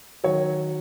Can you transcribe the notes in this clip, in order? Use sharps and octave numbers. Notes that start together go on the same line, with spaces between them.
D#3 F#3 C#5